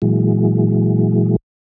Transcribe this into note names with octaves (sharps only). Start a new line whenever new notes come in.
A#2 E3 F#3 G#3